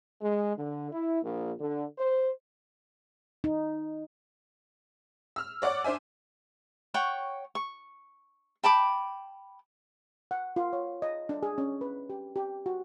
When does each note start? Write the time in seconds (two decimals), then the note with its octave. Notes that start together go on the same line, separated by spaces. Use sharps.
0.22 G#3
0.57 D3
0.92 E4
1.23 A#1
1.60 D3
1.98 C5
3.44 D#4
5.36 E6 F6
5.62 C#5 D5 F#5 D6
5.84 D4 C5 E5 G#5
6.94 C#5 F#5 G5 C#6
7.55 C#6
8.63 G5 A5 B5 D6
10.31 F#5
10.56 F4
10.73 C#5
11.02 D#5
11.29 D4
11.43 G#4
11.58 C#4
11.81 B4
12.10 G4
12.36 G4
12.66 F#4